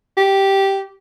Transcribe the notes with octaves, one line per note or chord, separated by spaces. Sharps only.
G4